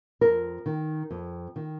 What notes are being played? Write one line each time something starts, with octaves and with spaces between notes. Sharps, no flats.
F2 A#4
D#3
F2
D#3